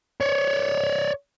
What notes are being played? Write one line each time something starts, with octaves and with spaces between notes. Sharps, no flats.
C#5 D5